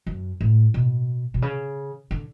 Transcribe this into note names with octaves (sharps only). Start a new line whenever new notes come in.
F#2
A2
B2
B2
C#3
D3